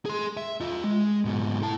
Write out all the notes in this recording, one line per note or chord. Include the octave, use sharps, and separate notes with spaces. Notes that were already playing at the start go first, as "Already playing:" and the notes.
G#4 C6
E5
F4 D#5
G#3
G#2 B2
E4 A5